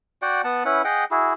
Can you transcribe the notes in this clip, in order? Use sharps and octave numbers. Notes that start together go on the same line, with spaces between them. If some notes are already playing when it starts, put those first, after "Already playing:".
F#4 D5 F#5 G5
B3 F#5 A5
C#4 E4 B4 F#5
G#4 D#5 F#5 G5
E4 F#4 G#4